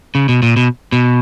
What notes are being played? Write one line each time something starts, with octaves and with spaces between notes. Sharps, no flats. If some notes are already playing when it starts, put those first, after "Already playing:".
C#3
B2
A#2
B2
B2